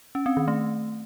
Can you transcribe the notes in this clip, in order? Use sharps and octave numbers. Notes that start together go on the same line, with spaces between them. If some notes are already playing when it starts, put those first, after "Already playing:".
C#4
C4
D#3
A3